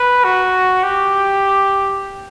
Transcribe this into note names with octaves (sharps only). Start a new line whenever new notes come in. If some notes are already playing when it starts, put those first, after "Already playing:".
Already playing: B4
F#4
G4